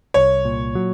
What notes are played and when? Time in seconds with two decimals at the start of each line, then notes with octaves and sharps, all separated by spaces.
0.14 C2 C#5
0.45 A#2
0.75 F#3